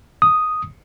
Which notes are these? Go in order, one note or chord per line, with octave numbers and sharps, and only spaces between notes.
D#6